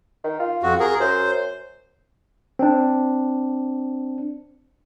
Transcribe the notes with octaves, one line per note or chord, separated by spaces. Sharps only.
D#3
F4
F2 F#4
G#4 A#4
F#2 C5
C4 D4